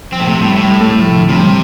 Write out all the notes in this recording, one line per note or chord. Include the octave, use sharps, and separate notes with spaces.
F3 C4
A2
C3 A3
A2 G3
A2 G3
G3
A3
G3
F3
C3
D3
C3 F3
G3
F3